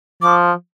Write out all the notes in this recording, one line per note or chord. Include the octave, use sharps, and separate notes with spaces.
F3 D6